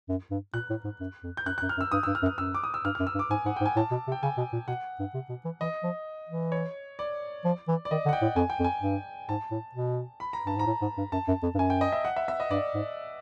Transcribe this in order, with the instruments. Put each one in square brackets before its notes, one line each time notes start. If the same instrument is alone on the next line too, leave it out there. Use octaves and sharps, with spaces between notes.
[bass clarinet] F#2
G2
[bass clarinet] A#2 [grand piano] F#6
[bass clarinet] A2
G#2
F#2
F2
[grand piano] G6
[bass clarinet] F#2 [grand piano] F#6
[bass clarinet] F#2 [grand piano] F#6
[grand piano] F6
[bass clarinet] F#2
[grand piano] E6
[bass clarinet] G2 [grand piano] D#6
[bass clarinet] G2 [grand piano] E6
[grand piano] F6
[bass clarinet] F#2
[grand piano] F6
[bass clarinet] F#2 [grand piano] E6
[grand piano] D6
D#6
E6
[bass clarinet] G2 [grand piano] F6
[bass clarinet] F#2 [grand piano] F6
[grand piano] E6
[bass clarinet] G2
[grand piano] D6
[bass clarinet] G#2 [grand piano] G#5
[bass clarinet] G#2 [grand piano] F#5
[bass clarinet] G#2 [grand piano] G5
[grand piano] G#5
[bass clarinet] A2 [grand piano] A5
[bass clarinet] B2
C3
[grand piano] G5
[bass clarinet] C#3 [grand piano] G#5
[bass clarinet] B2
A#2
[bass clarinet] B2 [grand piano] F#5
[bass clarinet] G2
C3
B2
E3
[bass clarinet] E3 [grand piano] D#5
[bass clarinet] F3
E3
[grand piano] C#5
D5
[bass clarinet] F3
E3
[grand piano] D5
[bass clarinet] D#3 [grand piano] D#5
[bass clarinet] D3
[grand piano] F#5
G5
[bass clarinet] A2
[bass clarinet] F2 [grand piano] G#5
[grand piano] G5
[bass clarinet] F2
[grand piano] G#5
[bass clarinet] G2
[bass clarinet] G#2 [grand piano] A5
[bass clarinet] A2
B2
[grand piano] B5
A#5
[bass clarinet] G2 [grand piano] A5
[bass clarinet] G#2 [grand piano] A#5
[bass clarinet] A2
G#2
G2
[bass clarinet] F#2 [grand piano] A5
[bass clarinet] F#2
F2
G2
[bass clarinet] F#2 [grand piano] G#5
[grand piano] G5
D#5
E5
F#5
E5
E5
D#5
[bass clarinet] G2 [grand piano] D5
[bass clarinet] G#2